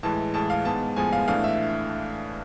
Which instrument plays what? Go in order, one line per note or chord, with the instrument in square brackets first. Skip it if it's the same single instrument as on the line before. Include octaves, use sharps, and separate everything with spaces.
[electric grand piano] A2 E3 G#3 [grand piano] A5
[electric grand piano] A2 E3 G#3 [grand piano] A5
[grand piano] F5
[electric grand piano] G#2 G#3 B3 [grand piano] A5
[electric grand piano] A2 F3 G#3 B3 [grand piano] G#5
[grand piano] F5
[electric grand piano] A2 E3 A3 D4 [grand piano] F5
[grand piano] E5